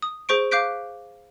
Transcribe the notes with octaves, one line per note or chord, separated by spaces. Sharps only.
D#6
G#4 C5 C#6 D7
F5 D6 F#6 G6 B6 D7